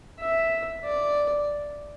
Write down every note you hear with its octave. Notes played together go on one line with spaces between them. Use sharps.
E5
D5